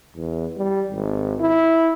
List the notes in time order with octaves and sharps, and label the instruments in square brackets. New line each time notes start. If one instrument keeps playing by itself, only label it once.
[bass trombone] E2
G3
G#1
E4